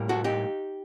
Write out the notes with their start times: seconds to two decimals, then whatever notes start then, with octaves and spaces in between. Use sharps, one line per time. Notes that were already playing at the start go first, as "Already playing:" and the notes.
Already playing: A2 G3 A#3
0.09 F#4 A4
0.24 D#4 G4